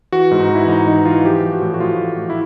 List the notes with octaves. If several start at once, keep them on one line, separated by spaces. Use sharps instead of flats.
E3 F#4
G#2
D#4
E3
E4
G#2 D#4
E3 D#4
E3 F4
F3 G4
F3
F#4
A2
F#4
A2 F4
F3
A2
E4